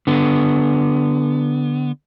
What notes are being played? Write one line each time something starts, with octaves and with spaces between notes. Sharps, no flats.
D3 B3